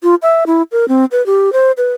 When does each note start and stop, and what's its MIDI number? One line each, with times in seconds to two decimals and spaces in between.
0.03 0.15 65
0.22 0.44 76
0.47 0.62 64
0.72 0.88 70
0.88 1.05 60
1.12 1.25 71
1.26 1.53 67
1.53 1.72 72
1.77 1.92 71